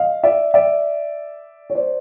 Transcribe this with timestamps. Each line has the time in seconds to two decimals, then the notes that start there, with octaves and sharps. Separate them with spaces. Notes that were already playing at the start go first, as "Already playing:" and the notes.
Already playing: D#5 F5
0.23 D5 E5
0.54 D5 E5
1.70 C#5
1.75 C5 D5